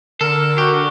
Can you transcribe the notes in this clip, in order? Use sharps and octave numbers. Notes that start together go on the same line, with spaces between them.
D3 A4 A#4
F#4 G4